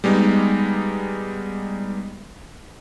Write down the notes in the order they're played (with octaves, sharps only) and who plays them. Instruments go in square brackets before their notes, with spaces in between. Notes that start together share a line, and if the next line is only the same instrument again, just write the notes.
[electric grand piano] G3 G#3 B3 D#4